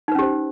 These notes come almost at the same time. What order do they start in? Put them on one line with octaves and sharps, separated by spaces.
D#4 B4 C#4 G4 C5